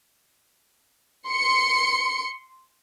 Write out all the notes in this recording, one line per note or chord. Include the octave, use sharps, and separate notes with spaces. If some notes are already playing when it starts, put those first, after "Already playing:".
C6 C#7